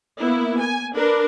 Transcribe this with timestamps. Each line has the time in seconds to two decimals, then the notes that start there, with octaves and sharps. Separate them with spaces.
0.20 A#3 B3 E4
0.61 G#5
0.96 D4 A#4 B4